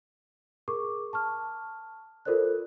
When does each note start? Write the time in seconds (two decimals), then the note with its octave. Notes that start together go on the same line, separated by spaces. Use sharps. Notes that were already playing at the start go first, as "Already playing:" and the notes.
0.68 G#4 A#4 C#6 D6
1.13 A5 C#6 F6
2.25 F4 A4 A#4 C5 D5 F#6